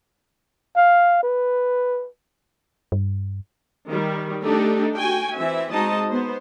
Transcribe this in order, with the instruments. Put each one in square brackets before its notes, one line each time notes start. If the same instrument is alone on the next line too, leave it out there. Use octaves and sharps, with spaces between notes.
[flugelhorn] F5
B4
[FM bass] G2
[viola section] D#3 G3
A3 D4 D#4 G4 A4
F#4 G5 G#5
E3 C4 E5
G#3 C4 D#4 F#4 D#5 A5
B3 C5